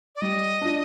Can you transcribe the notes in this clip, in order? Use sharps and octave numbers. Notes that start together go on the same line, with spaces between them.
D5
G3 D#5
D4 F4